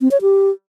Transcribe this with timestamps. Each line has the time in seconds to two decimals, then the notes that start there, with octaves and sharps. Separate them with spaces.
0.01 C4
0.11 C#5
0.22 G4